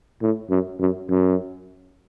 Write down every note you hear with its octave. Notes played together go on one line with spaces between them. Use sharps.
A2
F#2
F#2
F#2